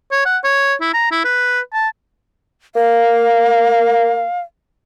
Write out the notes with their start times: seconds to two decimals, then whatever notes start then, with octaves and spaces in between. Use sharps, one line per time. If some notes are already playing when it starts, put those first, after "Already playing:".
0.11 C#5
0.25 F#5
0.44 C#5
0.81 E4
0.94 A#5
1.11 E4
1.25 B4
1.73 A5
2.75 A#3 F5